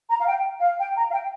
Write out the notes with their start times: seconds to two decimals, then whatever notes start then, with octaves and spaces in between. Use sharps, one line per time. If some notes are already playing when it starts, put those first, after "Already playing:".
0.09 A#5
0.19 F5
0.26 G5
0.61 F5
0.79 G5
0.96 A#5
1.08 F5
1.12 G5